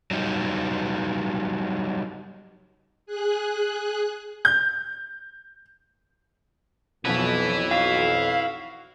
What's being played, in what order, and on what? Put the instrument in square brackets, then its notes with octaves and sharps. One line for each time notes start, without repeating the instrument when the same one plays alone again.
[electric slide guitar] F#3 G3 D#4
[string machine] G#4 F#6
[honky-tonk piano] G6
[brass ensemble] B1 F2 [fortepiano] B2 F3 F#3 [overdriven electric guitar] E4 B4
[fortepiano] F#4 [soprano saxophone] F5